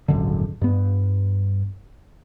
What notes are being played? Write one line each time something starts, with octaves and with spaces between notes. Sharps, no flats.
D#1 G#1 F#2 D3
G2 B3